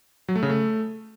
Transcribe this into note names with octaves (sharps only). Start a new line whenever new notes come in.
F#3
A3
C#3
A3